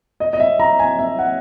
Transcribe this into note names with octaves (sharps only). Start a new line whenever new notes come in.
D#5
D#5
E5
A#5
G#5
E5
F#5